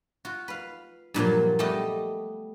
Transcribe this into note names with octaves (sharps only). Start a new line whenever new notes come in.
F4 F#4
B4 F5
G2 A#2 F3 F#3
G3 A3 B3 G4 D#5